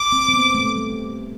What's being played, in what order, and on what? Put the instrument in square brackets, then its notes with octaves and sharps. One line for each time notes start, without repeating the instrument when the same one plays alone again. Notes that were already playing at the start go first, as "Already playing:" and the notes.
Already playing: [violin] D6
[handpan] C4
C4
B3
A3
G3